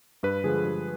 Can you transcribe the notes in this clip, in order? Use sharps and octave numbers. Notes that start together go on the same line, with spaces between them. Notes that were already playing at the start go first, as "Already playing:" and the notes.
G2 B4
D3 F3 G#3 G#4
G2